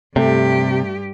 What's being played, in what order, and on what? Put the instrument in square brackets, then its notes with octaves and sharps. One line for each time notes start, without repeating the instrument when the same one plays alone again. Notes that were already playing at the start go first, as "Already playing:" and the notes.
[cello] G2 G4 [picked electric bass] C3 [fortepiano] A3